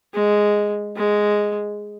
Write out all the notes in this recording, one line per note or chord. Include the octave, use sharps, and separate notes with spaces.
G#3
G#3